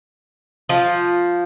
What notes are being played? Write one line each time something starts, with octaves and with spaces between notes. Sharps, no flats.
F3